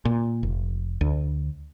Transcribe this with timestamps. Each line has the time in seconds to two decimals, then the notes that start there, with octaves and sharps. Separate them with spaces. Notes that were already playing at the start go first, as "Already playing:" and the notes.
0.05 A#2
0.43 F1
1.01 D2